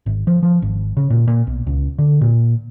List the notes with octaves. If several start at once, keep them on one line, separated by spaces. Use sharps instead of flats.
G#1
F3
F3
G#1
C#3
A#2
A#2
B1
C#2
D3
A#2